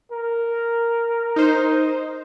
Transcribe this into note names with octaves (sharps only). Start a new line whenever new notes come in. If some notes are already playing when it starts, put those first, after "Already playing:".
A#4
D#4 C5